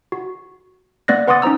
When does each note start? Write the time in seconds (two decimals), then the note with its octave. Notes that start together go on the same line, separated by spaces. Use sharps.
0.12 F#4
1.08 A#3 B3 D5 F#6 A#6
1.28 B4 F#5 C6 D6 D#6 A6
1.42 C#4 D#4 C5 A#5 E6